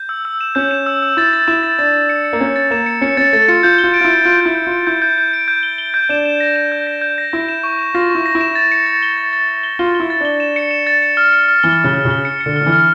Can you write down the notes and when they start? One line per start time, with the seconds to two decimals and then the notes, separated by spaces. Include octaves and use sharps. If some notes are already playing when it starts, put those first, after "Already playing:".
Already playing: G6
0.09 E6
0.25 E6
0.41 E7
0.55 C#4 G6
0.71 E7
0.86 E6
1.02 E6
1.17 E4 A6
1.33 A6
1.48 E4 E7
1.63 A6
1.79 D4 A6
1.94 A6
2.09 C#7
2.24 C#7
2.33 A#3
2.40 C#4 A6
2.56 A6
2.71 A#3 E7
2.86 C#7
3.01 C#4 C#7
3.17 C#4 A6
3.33 A3 A6
3.48 F4 C#7
3.63 F4 G6
3.78 G7
3.84 F4
3.94 D7
4.01 F4
4.05 E4
4.10 D7
4.25 F4 D7
4.41 E4 G6
4.55 G6
4.67 F4 D7
4.86 E4 G6
5.02 G6
5.18 G6
5.33 D7
5.48 G6
5.63 G7
5.78 G7
5.94 G6
6.09 D4 E7
6.26 E7
6.40 A#6
6.56 E7
6.72 G6
6.87 A#6
7.01 G6
7.18 A#6
7.33 E4 A#6
7.49 E7
7.63 C#6
7.79 E7
7.94 F4 A#6
8.10 C#6
8.15 E4
8.26 A#6
8.35 E4
8.41 E7
8.55 A6
8.72 C#7
8.86 A6
9.03 G7
9.17 A6
9.33 A6
9.49 A6
9.63 G7
9.79 F4 G7
9.95 G7
10.00 E4
10.10 A6
10.21 D4 G7
10.40 E7
10.56 C#7
10.71 E7
10.87 A6
11.02 C#7
11.17 F6
11.33 C#7
11.48 F6
11.63 E3 G7
11.79 G7
11.84 C#3
11.95 F6
12.05 C#3
12.11 G7
12.25 C#7
12.40 C#7
12.46 D3
12.56 F6
12.61 D3
12.66 E3
12.72 F6